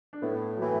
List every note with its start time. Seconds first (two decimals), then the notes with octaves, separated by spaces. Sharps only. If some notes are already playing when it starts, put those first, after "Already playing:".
0.13 D4
0.22 A2 B3
0.57 F#3
0.62 E3 A3